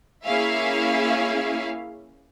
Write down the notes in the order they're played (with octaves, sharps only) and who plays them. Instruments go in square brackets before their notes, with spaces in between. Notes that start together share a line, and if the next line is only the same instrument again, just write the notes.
[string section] A#3 C#4 E4 G#4 E5 F5